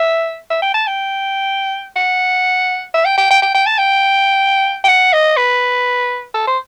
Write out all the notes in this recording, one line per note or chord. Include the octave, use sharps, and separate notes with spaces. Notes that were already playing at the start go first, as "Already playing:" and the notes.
Already playing: E5
E5
G5
A5
G5
F#5
E5
G5
G5
G5
G5
G5
A5
G5
G5
F#5
D#5
B4
A4
C5